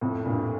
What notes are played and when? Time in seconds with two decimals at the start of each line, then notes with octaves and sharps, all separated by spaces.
0.01 F2 A2
0.25 G2 A#2